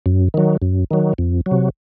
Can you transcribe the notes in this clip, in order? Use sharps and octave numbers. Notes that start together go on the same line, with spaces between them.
F#2
D#3 F#3
F#2
D#3 F#3
F2
F#3
C3